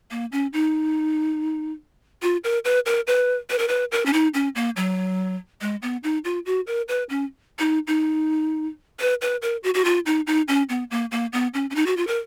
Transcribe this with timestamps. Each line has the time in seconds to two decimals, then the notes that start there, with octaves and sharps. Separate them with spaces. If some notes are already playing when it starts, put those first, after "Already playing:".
0.11 A#3
0.32 C#4
0.53 D#4
2.22 F4
2.44 A#4
2.65 B4
2.86 A#4
3.07 B4
3.50 B4
3.59 A#4
3.68 B4
3.92 A#4
4.06 C#4
4.13 D#4
4.34 C#4
4.55 A#3
4.76 F#3
5.61 G#3
5.82 B3
6.03 D#4
6.24 F4
6.46 F#4
6.67 A#4
6.88 B4
7.09 C#4
7.59 D#4
7.87 D#4
9.00 B4
9.21 B4
9.42 A#4
9.64 F#4
9.74 F#4
9.85 F4
10.06 D#4
10.27 D#4
10.48 C#4
10.69 B3
10.91 A#3
11.11 A#3
11.33 B3
11.54 C#4
11.70 C#4
11.75 D#4
11.86 F#4
11.97 F4
12.07 A#4